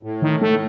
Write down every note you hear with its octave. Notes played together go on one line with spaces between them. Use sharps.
A2
D#3
A3